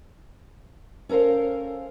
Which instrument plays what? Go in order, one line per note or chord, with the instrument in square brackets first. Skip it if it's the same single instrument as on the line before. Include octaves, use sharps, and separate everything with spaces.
[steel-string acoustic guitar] C#4 A4 A#4 C5 F5